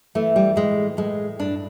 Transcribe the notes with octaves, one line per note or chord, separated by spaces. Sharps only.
E3 A3
G3
A2 G#3
A2 G#3
G2 D4